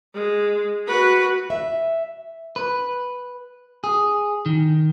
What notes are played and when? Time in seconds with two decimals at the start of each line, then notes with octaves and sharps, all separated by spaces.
0.15 G#3
0.87 F#4 B4
1.50 E5
2.56 B4
3.84 G#4
4.46 D#3